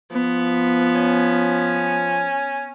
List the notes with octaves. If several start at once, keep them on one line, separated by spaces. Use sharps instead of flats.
F3 B3
C#4